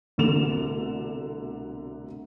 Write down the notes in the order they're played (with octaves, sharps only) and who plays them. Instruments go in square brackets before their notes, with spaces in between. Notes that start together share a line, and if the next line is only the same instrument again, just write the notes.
[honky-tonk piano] C2 B2 D3 A3 E7 F7